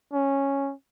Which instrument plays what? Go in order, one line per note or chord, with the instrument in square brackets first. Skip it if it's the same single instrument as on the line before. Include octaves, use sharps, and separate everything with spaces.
[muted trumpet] C#4